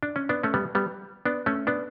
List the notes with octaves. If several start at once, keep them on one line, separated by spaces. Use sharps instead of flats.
D4
C#4
B3 D4
A3 C#4
G3 B3
G3 B3
B3 D4
A3 C#4
B3 D4